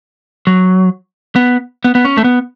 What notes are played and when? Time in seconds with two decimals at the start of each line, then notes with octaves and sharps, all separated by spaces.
0.47 F#3
1.36 B3
1.84 B3
1.95 B3
2.05 C#4
2.17 A3
2.24 B3